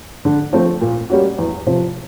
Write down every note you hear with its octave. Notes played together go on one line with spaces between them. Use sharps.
D3
F3 A3 C4
A#2
G3 A#3 C#4 F#4
E2
C3 F3